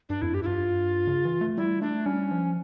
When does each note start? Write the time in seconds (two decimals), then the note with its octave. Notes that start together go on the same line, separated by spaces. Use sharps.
0.09 G2 D4
0.22 F2 E4
0.34 G2 G4
0.43 E4
0.46 G2 F4
1.07 C#3
1.25 E3
1.41 A3
1.57 G3 E4
1.81 A3 D4
2.06 G3 C#4
2.31 F3